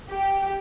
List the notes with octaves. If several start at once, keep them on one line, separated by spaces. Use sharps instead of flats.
G4